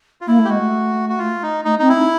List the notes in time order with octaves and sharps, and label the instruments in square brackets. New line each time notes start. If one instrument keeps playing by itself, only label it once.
[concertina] F4
[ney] A#3 [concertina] E4
[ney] A3
[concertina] G4
[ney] G#3 [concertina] F#4
[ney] A3
[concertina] F#4
F4
D#4
[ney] A3 [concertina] D#4
[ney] C4 [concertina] D#4
[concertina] E4
[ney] D#4